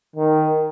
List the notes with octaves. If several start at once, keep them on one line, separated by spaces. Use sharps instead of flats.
D#3